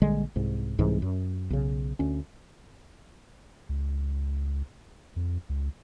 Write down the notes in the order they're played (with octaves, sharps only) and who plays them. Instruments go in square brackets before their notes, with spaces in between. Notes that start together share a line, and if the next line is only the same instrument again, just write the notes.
[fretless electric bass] A#1 D3 G3 G#3
C2 G#2
C2 G#2 E3 G#3
F#2
B1 C#3
D2 C#4
[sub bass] C#2
F2
C#2